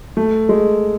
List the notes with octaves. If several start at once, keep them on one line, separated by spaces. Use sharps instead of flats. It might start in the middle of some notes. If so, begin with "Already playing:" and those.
A3
G#3